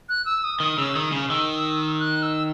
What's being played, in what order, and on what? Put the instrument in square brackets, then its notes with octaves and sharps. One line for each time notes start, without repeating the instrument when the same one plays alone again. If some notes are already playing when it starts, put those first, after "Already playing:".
[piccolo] F#6
E6
D#6
[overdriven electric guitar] D#3 [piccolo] D#6
[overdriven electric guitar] C#3 [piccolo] E6
[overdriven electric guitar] D#3 [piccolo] D#6
[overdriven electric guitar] C#3
[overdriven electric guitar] D#3 [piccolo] E6
[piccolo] F#6
E6